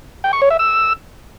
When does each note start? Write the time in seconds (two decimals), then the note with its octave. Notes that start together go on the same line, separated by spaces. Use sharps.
0.24 G5
0.33 C#6
0.42 C#5
0.50 E5
0.59 E6